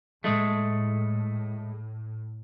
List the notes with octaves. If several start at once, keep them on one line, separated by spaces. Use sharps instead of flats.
A2 G#3 A3